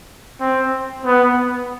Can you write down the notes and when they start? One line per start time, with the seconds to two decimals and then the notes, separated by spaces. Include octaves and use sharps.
0.41 C4
1.05 B3